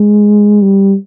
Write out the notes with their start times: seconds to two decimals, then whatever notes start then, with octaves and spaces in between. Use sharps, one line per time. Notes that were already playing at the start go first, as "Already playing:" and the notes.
Already playing: G#3
0.62 G3